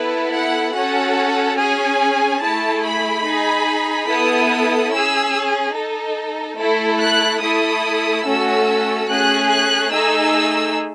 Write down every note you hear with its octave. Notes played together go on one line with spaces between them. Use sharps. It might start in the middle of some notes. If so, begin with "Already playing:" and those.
Already playing: B3 E4 A4 B4
F#5
C#4 F#4 A4 F#5
C#4 G#4 G#5
A3 E4 G#4 A5
B5
D#4 G#4
B3 E4 A4 D#6
C#4 G#4 E6
D#4 A4
A3 E4 A4
F#6
A3 E4 A4 D#6
A3 C#4 F#4 A4 E6
A3 C#4 G#4 F#6
F#6
A3 D#4 G#4 E6